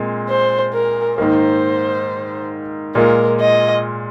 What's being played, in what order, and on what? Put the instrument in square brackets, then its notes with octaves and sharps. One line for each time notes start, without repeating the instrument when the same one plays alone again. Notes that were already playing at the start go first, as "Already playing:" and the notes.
Already playing: [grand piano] A#2 G#3 C4
[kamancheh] C5
A#4
[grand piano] G#2 D#3 A#3 [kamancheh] C5
[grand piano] A#2 G#3 F4 [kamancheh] A#4
[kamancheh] D#5